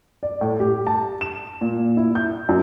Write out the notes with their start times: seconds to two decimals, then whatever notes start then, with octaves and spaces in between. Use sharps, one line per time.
0.23 D5
0.41 A2
0.60 G4
0.87 A5
1.21 E7
1.61 A#2
1.97 E4
2.15 G6
2.49 F#2